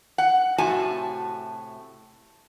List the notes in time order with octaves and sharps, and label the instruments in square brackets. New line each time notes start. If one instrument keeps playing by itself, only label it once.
[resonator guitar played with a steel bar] F#5
A2 C3 A3 F#4 G#5 A5